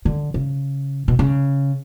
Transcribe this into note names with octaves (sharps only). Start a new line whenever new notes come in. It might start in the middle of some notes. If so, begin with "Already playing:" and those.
D3
C#3
B2
C#3